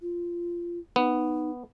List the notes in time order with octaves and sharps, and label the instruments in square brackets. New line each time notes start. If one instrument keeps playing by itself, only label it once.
[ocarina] F4
[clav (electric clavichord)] B3 [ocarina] D#4